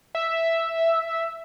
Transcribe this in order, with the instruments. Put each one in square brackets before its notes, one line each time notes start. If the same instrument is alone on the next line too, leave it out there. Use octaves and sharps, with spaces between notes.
[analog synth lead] E5